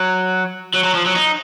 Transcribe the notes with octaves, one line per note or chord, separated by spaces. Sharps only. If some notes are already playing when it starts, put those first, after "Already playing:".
Already playing: F#3
F#3
F#3
F3
F#3
D#4